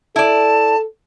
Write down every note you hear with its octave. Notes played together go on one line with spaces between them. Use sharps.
E4 A4 D5 A5